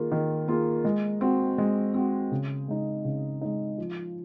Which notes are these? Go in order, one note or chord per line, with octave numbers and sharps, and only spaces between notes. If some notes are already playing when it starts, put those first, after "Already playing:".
Already playing: D#3 A#3 F4 G#4
D#3
A#3 F4 G#4
G#3
C4 F#4
G#3
C4 F#4
C#3
G#3 D#4
C#3
G#3 D#4
F3